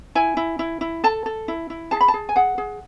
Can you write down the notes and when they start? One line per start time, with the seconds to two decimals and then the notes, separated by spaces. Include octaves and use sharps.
0.15 E4 G#5
0.37 E4
0.59 E4
0.81 E4
1.04 A4 A5
1.26 A4
1.48 E4
1.70 E4
1.91 G#4 A5
2.01 B5
2.08 A5
2.14 G#4
2.29 G#5
2.36 G#4 F#5
2.58 G#4